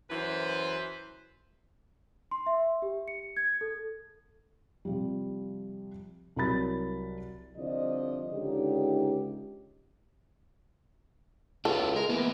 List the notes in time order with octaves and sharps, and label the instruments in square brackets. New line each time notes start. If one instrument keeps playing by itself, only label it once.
[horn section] F#2 E3 B4 C5
[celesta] C6
E5
G4
C#7
G#6
A4
[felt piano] C3 F3 G3
C2 F#3 A#4 B5 A6
[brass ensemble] C2 D3 F3 D5 D#5
C#2 D3 D#4 G4
[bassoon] C#2 [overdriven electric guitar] E4 F4 [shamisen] A4
[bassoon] G#3 [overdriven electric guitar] A#4
[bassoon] E3 [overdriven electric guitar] A#3 B3